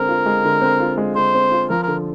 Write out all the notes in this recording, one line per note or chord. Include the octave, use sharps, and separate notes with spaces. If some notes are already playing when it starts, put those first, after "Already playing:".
Already playing: D3 G#3 C4 A#4
F4
G#3
D3
C4
F4
G#3
D3 C5
C4
F4
F3 A#4
D3 A#4